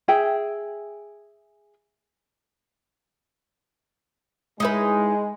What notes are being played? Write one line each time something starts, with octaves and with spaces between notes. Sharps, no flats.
G#4 E5 G5
G#3 D#4 E4 B4